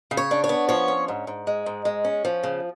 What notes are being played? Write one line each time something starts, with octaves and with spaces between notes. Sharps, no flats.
C#3
C#5
D4
C#5
B3
F3 C#5
C#4
G#2
G#2
G#3
G#2
G#3
C#4
F3
C#3